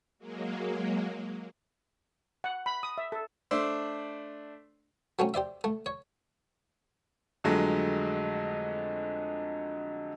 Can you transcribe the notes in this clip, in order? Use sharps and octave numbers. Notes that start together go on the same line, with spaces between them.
F#3 G#3 A#3
F#5
B5
D#6
E5
A4
A3 D4 C5 D5 C6 E6
F#3 A3 C4 C#4
G4 C5 D5 E5
A3
C#5
F2 D3 F#3 G#3 A3